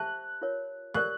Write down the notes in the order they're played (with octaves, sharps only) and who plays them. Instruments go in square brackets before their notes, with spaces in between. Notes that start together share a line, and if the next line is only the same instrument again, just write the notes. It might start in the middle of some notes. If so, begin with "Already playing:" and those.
Already playing: [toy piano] G4 C5 E5 A5 [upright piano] F#6
[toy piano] F4 A#4 C#5
[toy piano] G4 A#4 D5 [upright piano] F#6